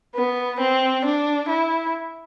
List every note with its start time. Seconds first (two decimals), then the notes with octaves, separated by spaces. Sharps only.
0.15 B3
0.60 C4
1.05 D4
1.49 E4